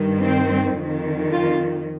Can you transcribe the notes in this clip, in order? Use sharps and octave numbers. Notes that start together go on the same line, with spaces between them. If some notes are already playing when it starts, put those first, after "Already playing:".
Already playing: G2 D#3
C4
F2 D#3
F4